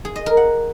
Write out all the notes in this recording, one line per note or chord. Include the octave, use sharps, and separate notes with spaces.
G#4
D#5
A#4
F#5